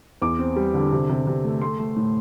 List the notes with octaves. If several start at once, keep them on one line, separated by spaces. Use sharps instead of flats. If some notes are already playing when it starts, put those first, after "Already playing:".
E2 D6
C4
G3
D3
C3
C3
C3
A3
A3 C6
A3
A2